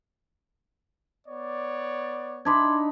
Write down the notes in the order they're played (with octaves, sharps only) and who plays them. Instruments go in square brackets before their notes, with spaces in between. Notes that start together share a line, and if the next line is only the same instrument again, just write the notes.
[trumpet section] B3 C#5 D5
[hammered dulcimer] D4 D#4 B5 [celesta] C6 D6 G#6